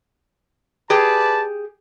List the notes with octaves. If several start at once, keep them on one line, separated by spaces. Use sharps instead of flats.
G4 G#4 B4 D5 A5